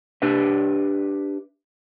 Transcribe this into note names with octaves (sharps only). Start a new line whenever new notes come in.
D4 G4 B4 E5